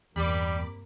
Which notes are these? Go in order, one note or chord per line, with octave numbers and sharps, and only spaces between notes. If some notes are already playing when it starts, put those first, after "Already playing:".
E2 G2 C3 G3 A#3 B5 D6